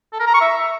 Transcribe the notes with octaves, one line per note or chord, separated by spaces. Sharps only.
A4
A#4
A#5
C#6
E5